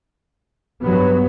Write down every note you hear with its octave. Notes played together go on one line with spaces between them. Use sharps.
G2 F#3 B3